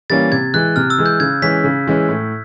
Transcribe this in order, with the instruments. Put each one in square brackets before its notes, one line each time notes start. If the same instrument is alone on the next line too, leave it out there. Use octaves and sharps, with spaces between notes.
[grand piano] E3 G3 A#3 C#4 [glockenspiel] A6
[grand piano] C3 [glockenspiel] G#6
[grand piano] E3 G#3 [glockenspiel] F#6
[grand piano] C3 [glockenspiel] F6
[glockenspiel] E6
[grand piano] E3 G#3
[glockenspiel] G6
[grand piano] C#3 [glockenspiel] G#6
[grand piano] E3 G#3 C#4 [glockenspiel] B6
[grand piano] C#3
E3 G#3 C#4
A2